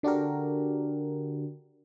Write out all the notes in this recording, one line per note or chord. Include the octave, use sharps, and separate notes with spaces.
D3 D4 F#4 G4 A#4